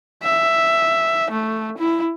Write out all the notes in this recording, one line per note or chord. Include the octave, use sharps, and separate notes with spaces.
E5
A3
E4